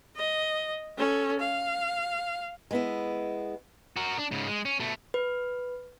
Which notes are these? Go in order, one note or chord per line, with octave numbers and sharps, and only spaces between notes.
D#5
C#4 A4
F5
G#3 B3 E4
F#4 A#4
D4
G#2 C#3
G#3
C#4
B2 A3
B4